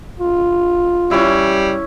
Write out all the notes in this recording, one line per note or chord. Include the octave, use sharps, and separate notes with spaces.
F4
G3 C#4 E4